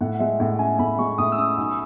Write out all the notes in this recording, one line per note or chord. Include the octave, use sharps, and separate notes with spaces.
A2 F#5
F#5
G#3 E5
A2 F#5
C#4 G#5
A2 B5
G#3 C#6
A2 D#6
E6
C#4 D#6
B1